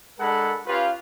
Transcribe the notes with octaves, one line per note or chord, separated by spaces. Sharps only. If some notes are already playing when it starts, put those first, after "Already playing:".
G#3 D4 A4 A#4 F#5 B5
C#4 F4 G4 B4 F5